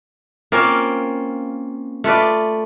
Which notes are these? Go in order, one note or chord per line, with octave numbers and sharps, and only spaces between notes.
A#3 C4 C#4 F4
A3 F4 B4 D5